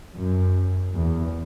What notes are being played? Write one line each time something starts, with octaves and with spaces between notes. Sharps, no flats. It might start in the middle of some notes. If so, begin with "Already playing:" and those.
F#2
E2